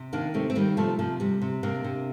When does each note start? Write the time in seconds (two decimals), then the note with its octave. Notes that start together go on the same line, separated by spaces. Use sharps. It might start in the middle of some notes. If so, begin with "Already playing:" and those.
Already playing: C3
0.13 D#3 A#3 D4
0.34 C3 A3 C4
0.50 C4
0.55 D#3 G3 A#3
0.77 C3 F3 A3
0.99 C3 F3
1.20 C3 G3
1.42 C3
1.63 C3 A#3 D4
1.84 C3